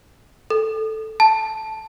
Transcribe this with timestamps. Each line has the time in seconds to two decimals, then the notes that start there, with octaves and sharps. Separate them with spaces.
0.50 A4
1.20 A5